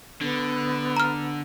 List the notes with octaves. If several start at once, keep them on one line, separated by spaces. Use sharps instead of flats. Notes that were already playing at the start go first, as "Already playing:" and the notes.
D3 B3
A#5 F6